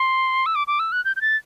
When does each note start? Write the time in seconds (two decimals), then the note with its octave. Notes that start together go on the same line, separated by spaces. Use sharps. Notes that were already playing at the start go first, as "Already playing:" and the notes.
Already playing: C6
0.46 E6
0.55 D6
0.67 D6
0.79 E6
0.92 F#6
1.05 G6
1.16 G6
1.21 A6